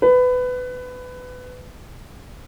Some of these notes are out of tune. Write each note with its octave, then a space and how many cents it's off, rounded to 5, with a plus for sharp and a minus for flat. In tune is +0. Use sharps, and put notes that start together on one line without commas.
B4 +20